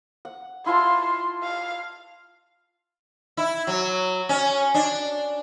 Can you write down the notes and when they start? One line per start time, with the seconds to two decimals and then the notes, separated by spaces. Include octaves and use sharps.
0.25 F#5
0.66 E4 F4 A5 C6
1.43 F5
3.37 E4
3.67 F#3
4.29 C#4
4.74 D4